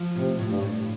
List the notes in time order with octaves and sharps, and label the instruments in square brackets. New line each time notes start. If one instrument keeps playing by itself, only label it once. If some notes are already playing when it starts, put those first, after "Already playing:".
Already playing: [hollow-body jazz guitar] F3
[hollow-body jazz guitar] A2 [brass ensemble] C3
[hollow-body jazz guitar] A2
[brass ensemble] G2
[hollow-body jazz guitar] A2